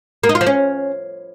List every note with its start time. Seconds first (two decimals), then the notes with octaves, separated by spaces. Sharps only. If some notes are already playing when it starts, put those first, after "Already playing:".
0.23 A#3
0.29 D#4
0.35 F4
0.41 F3
0.47 C#4